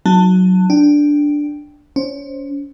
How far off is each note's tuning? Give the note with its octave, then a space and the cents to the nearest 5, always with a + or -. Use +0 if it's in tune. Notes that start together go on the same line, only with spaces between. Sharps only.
F#3 +0 D#4 +20 A5 +20
D4 +0 G5 +0
C#4 +30 C5 +15